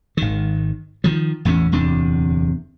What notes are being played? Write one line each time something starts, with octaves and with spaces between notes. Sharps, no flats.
G#1 D#3
D#3 F3
A1 E2 A2 C#4
D1 E2 C3 D4